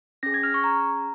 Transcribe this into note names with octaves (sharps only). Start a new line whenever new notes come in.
C#4 G#4 A#6
G#6
F6
C#6
A#5